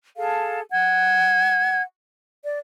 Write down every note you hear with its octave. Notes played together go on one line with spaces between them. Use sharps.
G#4 A4 F5 A5
F#5 G#6
D5